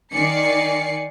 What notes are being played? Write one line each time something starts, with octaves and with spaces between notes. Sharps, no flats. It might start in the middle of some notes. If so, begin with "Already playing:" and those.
D#3 D5 G#5 C7 C#7